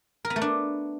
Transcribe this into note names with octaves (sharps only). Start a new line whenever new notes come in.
A#4
B3
A3
D4